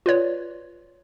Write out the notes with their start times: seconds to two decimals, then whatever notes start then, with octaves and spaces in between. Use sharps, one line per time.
0.06 F4 B4 C#5 D5